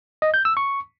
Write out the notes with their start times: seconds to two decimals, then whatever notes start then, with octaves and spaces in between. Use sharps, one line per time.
0.22 D#5
0.34 G6
0.45 E6
0.57 C#6